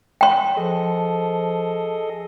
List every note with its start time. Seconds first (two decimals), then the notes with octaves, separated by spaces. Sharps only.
0.21 G5 C6
0.57 F3 G#4 A4 D#5